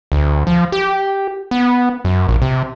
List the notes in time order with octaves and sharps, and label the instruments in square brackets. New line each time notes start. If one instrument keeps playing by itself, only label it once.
[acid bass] D2
F3
G4
B3
F#2
A#1
C3